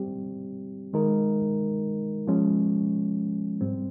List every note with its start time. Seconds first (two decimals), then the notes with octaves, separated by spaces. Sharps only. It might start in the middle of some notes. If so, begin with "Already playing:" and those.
Already playing: G3 C4 G4
0.93 D#3 G#3 D#4 A#4
2.27 F3 G#3 C#4
3.61 G#2 G3 C4